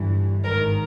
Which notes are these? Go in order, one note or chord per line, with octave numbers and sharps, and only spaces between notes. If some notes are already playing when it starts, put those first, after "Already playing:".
Already playing: G1 G2 E3
G#1 G#2 D#3 A#4